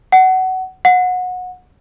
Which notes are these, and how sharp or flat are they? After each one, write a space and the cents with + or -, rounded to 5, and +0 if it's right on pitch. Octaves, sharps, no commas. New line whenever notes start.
F#5 +20
F#5 -25